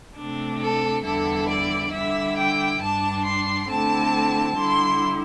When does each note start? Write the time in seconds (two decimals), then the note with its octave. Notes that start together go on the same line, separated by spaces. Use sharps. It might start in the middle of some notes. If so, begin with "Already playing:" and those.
0.16 C3 A3 D4
0.61 A4
1.04 E2 D3 G3 E4 A4
1.48 D5
1.92 D3 G3 E4 E5
2.36 G5
2.80 G2 G3 D4 A5
3.24 C6
3.69 D3 A3 C4 E4 A5
4.56 D3 G3 E4 C6